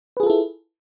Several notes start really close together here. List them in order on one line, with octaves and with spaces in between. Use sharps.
B4 G#4 F4 A4 E4